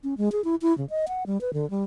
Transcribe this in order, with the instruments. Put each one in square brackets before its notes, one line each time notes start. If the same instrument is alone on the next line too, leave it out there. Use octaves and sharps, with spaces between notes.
[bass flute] C#4
G#3
G#4
E4
E4
C#3
D#5
F#5
G3
B4
D3
G3